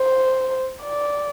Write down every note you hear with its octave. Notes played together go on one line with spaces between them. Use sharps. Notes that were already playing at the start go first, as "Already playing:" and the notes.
Already playing: C5
D5